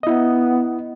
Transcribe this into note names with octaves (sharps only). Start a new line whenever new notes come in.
B3 E4 D#5